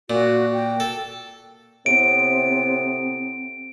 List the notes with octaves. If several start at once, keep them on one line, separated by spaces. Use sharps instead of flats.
A#2 F#4
G5
A4
A2 C3 B3 C4 D7